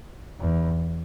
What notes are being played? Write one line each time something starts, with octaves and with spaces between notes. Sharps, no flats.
E2